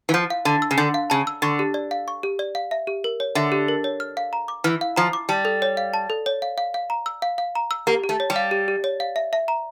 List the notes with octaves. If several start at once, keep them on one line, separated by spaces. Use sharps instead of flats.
E3
F3 G6
F5
D3 A5
E6
C#3
D3 G6
F5
C#3 A5
E6
D3 C#6
G4
D5
F5
C#6
G4
D5
F5
E5
G4
A#4
C#5
D3 E5
G4
A#4
C#5
F6
F5
A#5
D6
E3 F6
F5
F3 A#5
D6
G3 A5
A4
C#5
F5
A5
A4
C#5
F5
F5
F5
A#5
E6
F5
F5
A#5
E6
A#3 G4
G4
A3
C#5
G3
F5
G4
G4
C#5
F5
E5
E5
A#5